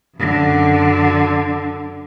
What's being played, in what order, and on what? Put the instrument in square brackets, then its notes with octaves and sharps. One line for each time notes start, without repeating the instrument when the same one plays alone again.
[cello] F#2 D3